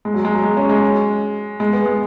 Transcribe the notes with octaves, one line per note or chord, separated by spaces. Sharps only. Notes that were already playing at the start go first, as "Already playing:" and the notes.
G#3
F#3
G#3
F#3
G#3
C#4
G#3
G#3
B3
G#3